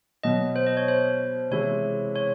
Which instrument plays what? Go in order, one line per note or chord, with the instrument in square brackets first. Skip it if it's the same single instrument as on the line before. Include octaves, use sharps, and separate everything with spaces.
[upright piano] B2 F#3 B3 [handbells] D#5
[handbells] C5
D#5
C#5
C5
[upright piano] C3 E3 G#3 C4 E4 [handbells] C#5
[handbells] C#5